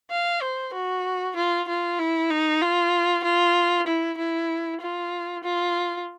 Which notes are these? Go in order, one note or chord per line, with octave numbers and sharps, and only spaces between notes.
F5
C5
F#4
F4
F4
E4
D#4
F4
F4
E4
E4
F4
F4